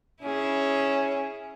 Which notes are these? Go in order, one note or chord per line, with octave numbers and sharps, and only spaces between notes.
C#4 E4 G#4